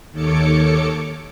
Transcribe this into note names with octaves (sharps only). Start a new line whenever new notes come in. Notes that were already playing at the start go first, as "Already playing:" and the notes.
D#2 D#3 A4 C#5 D6 C#7